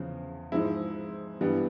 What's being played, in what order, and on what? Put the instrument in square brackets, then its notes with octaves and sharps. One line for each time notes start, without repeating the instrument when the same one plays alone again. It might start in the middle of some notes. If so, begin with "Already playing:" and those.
Already playing: [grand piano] E2 C#3 F3
G#2 F3 G#3 E4
G2 E3 G3 B3